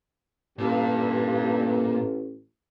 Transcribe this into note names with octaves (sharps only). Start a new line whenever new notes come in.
A1 G2 A#2